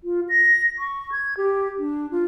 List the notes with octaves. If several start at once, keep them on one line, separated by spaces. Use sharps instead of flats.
F4
A#6
C#6
G#6
G4
D4
F4